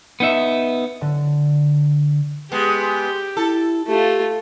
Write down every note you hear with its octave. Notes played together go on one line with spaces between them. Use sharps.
B3 D#4 E5
D3
G#3 B3 G4
E4 A4
A3 F4 G4